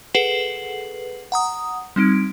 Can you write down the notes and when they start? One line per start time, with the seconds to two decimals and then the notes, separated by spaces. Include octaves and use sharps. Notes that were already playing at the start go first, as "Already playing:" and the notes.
0.14 G#4 A4 B4 F#5 C7 F#7
1.32 F#5 A#5 D#6
1.96 G3 C4 D#4 D7